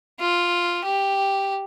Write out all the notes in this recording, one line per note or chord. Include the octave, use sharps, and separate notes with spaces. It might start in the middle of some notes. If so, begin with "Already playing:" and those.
F4
G4